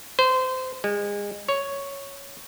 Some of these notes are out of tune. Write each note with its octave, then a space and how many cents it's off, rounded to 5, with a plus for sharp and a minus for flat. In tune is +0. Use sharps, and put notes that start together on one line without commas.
C5 -25
G#3 -30
C#5 +5